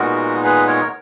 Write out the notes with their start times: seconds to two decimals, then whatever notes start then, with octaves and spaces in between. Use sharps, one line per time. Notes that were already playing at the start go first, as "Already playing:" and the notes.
Already playing: A#2 G#3 B3 D#4 F#4 A#4
0.44 G#4 B4
0.67 A#4 C#5